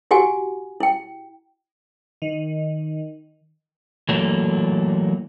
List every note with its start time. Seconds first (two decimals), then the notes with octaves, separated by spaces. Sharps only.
0.11 E4 F#4 G4 F#5 G#5
0.80 E4 G5
2.22 D#3
4.09 E3 F#3 A3 A#3